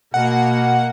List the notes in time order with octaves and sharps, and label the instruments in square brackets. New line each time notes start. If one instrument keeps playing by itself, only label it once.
[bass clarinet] B2 [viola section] A#3 [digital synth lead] F#5